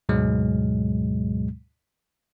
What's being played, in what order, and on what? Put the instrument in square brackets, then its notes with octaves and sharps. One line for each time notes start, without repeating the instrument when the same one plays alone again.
[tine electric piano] D2 G#2 B2 F#3 G#3